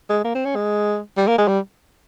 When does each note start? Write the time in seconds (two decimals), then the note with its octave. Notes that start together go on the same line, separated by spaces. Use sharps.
0.09 G#3
0.24 A#3
0.35 C4
0.45 C#4
0.55 G#3
1.17 G3
1.28 A#3
1.38 G#3
1.48 G3